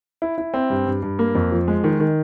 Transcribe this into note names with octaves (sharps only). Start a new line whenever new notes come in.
E4
E4
C4
G2
G2
G2
A#3
F2
F3
G#3
D#3
D#3